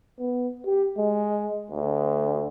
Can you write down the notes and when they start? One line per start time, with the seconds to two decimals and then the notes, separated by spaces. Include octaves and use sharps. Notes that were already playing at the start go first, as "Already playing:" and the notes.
0.19 B3
0.66 G4
0.97 G#3
1.71 D2